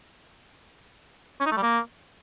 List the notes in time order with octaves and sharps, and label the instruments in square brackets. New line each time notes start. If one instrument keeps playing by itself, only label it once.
[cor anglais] C#4
D#4
A3
G3
A#3